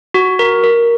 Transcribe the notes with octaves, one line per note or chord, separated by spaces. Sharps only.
F#4
A#4
A#4